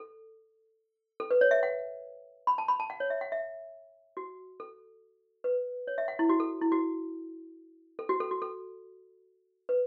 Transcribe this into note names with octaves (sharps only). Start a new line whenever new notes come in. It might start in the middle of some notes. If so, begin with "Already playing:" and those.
Already playing: A4
A4
B4
C#5
E5
F#5
B5
A5
B5
A5
F#5
C#5
E5
F#5
E5
F#4
A4
B4
C#5
E5
F#5
E4
F#4
A4
E4
F#4
A4
F#4
A4
F#4
A4
B4